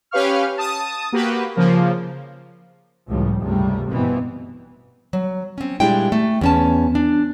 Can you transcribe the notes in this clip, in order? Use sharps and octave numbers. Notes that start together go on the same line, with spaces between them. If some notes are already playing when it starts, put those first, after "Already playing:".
C#4 G4 B4 F5 C#6 F6
A5 D#6
A#3 F#4 G4 B4
C#3 F3 A#3
C#2 A2 F3 G3
C#2 G2 C3 G3 A3
G#1 G2 B2 E3 B3 C4
F#3
C4 C#4
A#2 G3 G#3 D4 E4 G5
A3
E2 C#4 A5
D4